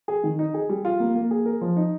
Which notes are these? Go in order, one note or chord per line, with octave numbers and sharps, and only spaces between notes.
G#4
D#3
D#4
G#4
G3
F4
A#3
A#3
G#4
A#4
F3
D#4